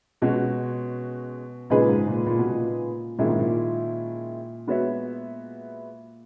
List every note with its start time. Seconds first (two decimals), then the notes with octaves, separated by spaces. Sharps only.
0.22 B2 G#3 C#4 F#4
1.70 A#2 C#3 G#3 D#4 G#4 B4
1.89 G#2
2.07 A#2
2.26 A#2
2.38 B2
2.51 A#2
3.19 A#2 D#3 G#3 C#4 E4
3.29 G#2
3.39 A#2
4.67 G#3 B3 F#4 C#5 E5